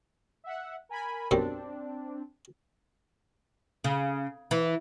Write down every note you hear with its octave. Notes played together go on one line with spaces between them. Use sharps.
E5 F#5
A#4 G#5 B5
F#2 B2 G3 C4 D4
C#3
E3